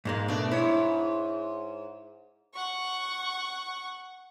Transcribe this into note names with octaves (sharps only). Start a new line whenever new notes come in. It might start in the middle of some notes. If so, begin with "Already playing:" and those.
G#2 G#3 A#3
B2 A3 D4
G#2 E4 C#5
F#5 C#6